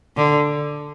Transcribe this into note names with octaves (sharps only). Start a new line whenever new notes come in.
D3